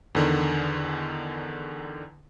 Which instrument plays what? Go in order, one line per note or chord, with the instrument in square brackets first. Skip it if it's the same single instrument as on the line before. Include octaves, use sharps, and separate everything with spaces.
[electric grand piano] E2 D3 D#3